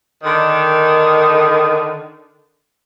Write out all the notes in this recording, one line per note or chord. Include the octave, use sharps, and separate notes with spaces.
D3 D#3